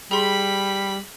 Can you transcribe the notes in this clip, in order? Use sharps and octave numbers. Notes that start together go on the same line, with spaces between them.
G3 G#4 B5 C6